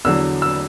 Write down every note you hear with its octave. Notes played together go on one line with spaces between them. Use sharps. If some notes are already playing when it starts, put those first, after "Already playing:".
E2 D3 F#3 E6
E6